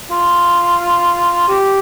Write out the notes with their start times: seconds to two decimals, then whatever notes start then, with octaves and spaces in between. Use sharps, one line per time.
0.11 F4
1.48 G4